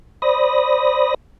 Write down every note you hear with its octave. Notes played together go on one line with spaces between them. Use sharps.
C5 D5 B5 D#6 A#6